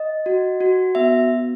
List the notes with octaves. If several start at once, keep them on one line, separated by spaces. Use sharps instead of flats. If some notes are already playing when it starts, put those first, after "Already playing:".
Already playing: D#5
F#4
F#4
B3 E5